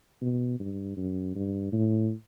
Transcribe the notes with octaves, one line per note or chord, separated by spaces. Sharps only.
B2
G2
F#2
G2
A2